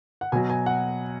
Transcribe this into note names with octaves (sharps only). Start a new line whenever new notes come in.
F#5
B2 F#3 G#5
G#5
F#5